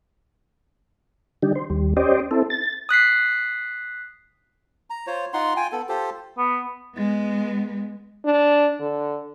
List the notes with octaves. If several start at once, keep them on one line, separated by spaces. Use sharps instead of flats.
D3 G3 D4 D#4 G4
C5
D#2 G3
C#4 G4 C5 D5 D#5
C4 E4 A4
A6
D#6 F#6 B6 C7
A#5
F4 C5 C#5
D#4 F4 F#5 C6
F4 G5 G#5
B3 A4
F4 G4 A4 C5
B3
G#3 B3
D4
D3